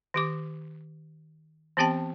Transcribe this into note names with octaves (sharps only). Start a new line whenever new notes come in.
D#3 G4 D6
E3 B3 C4 G4 G5 A5